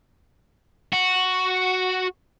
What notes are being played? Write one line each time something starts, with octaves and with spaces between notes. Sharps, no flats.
F#4